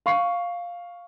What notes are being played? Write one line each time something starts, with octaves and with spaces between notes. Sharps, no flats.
F5 C#6 C7